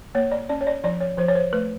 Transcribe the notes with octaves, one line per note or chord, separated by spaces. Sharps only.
A#3 C#5
D5
C#4 D5
C#5
D5
F3 D5
C#5
F3 C5
C#5
C5
A3 B4